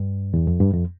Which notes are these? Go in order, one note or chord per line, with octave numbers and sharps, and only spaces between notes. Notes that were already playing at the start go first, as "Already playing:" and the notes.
Already playing: G2
E2
F2
G2
F2